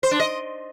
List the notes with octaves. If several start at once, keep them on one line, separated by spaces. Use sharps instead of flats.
C5
D4
D#5